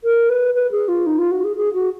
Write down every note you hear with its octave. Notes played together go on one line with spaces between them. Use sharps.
A#4
B4
B4
G#4
F4
D#4
F4
F#4
G#4
G#4
F#4